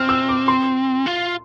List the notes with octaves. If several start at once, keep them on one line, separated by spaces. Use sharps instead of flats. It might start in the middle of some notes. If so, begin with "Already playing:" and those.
Already playing: C4 F6
E6
D6
C6
F4